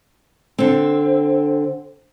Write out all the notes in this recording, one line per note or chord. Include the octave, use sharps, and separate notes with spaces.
D3 C4